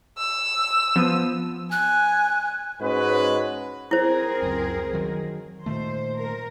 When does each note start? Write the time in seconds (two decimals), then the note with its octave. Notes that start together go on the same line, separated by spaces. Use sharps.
0.18 E6
0.96 F3 B3 D#7
1.72 G#5 F#6
2.80 G#2 G#3 C#4 F#4 B4
3.91 C4 E4 G#4 A#4 C5
4.42 C#2 F#2
4.93 D#3 F#3
5.66 A#2 D#3 A3 C5
6.17 A#4